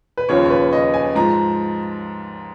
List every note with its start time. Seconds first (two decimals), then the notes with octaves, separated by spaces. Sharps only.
0.17 B4
0.29 D#2 C#3 F3 C#5
0.46 C#5
0.50 B4
0.73 D#5
0.94 G#5
1.16 G#2 F3 A#5